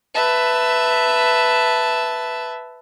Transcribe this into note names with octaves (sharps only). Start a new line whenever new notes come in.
B4 E5 A5